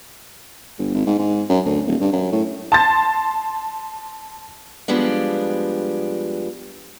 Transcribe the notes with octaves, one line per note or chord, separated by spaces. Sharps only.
G1
G#1
G#2
G#2
F#2
D2
D#1
G2
F#2
A2
A5 C6 A6
F2 F3 G3 G#3 B3 D4